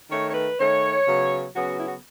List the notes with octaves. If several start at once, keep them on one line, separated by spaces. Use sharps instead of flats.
D#3 A3 C#5
C#5
B4
D#3 A3 C#5
C#3 F#3 B3
C#3 F#3 B3 F#4
E4
F#4